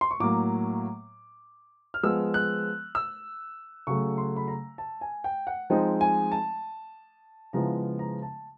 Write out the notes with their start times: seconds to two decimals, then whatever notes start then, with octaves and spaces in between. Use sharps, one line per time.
0.01 C6
0.11 C#6
0.20 A2 F#3 A#3 D6
1.94 F6
2.03 F3 G#3 B3 E6
2.34 F#6
2.95 E6
3.87 C#3 F#3 A3 C#6
4.18 C6
4.36 B5
4.48 A#5
4.78 A5
5.01 G#5
5.24 G5
5.47 F#5
5.70 F3 G#3 C4 D#4 G5
6.01 G#5
6.32 A5
7.53 C#3 F3 G#3 B3 E4 A#5
7.99 A#5
8.22 A5